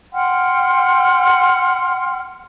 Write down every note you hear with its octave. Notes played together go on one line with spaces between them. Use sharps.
F#5 G5 C6 F6